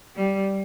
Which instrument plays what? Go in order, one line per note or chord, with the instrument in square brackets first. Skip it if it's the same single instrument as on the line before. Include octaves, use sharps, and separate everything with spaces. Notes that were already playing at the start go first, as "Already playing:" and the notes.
[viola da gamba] G3